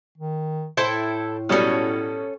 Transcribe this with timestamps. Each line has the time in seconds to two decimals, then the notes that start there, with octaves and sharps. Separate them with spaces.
0.18 D#3
0.77 A2 E4 A4 C5 G5
1.49 B2 F#3 G3 C#4 A4